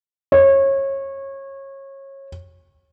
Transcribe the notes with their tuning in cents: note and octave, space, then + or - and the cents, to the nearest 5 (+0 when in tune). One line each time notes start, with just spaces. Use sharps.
C#5 -25